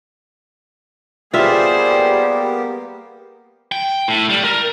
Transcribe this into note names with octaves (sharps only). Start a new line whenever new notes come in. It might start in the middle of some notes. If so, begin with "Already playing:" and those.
G3 A#3 B3 F4 G4 G#4 C5 E5
G5
A2
G3
A#4